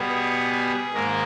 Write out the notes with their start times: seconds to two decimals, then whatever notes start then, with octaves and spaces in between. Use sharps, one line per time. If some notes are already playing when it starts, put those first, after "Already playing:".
Already playing: B2 G3 B3 G#4
0.93 G#2 D#3 A#3 A#4